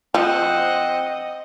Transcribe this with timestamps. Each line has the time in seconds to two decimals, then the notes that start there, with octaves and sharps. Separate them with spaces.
0.14 F3 C4 C5 D#5 F#5 D#6